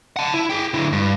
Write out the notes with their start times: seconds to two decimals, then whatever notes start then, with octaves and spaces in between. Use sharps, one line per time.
0.16 F#5 A5
0.34 E4
0.50 G#4 G5
0.74 D3 E4
0.92 G2